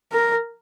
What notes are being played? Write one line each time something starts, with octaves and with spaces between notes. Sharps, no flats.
A#4